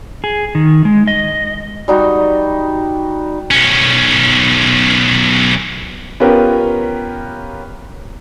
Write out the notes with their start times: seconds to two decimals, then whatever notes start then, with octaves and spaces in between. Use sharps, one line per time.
0.24 G#4
0.55 D#3
0.85 G#3
1.07 D#5
1.88 G3 D#4 F#4
3.51 B1 C#4
6.20 B3 C#4 F4 G4 A#4 B4